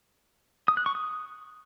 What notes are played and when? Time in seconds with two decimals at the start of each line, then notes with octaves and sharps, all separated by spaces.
0.68 D#6
0.77 F#6
0.86 C#6
0.95 D#6